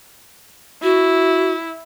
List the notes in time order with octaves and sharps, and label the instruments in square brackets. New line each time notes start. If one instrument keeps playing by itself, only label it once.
[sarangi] E4 [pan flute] F#4